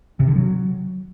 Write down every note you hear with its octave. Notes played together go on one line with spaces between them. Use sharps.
C3
D3
F#3